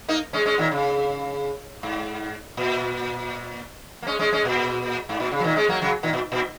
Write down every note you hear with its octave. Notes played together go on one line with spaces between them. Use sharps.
A#3 D#4
G#3 C#4
G#3 C#4
A#2 D#3
C#3
G#2
A#2
A#3
G#3 C#4
G#3 C#4
G#3 C#4
A#2
G#2
A#2
C#3
F#3
A#2 D#3
G#3 C#4
F#3 A#3
C#3 F#3
A#2 D#3
A#2
A#2